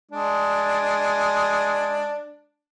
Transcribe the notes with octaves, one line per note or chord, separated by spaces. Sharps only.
G#3 D4